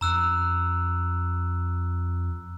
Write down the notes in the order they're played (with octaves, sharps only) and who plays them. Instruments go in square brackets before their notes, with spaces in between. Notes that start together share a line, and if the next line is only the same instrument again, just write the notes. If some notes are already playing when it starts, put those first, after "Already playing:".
[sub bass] F2 [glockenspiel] A#5 E6 F#6